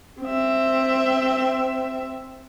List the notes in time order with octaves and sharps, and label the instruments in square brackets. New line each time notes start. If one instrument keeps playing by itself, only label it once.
[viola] C4 E5